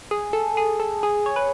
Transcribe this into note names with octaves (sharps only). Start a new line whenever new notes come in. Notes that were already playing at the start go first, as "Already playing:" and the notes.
G#4
A4
G#4
A4
G#4
C#5
B4